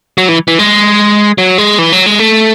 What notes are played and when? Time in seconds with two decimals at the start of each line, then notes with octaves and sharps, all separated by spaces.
0.18 F#3
0.29 E3
0.48 E3
0.59 G#3
1.38 F#3
1.58 G#3
1.79 E3
1.93 F#3
2.06 G#3
2.19 A3